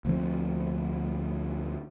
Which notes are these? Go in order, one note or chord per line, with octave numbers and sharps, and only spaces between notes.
D2 F3 C4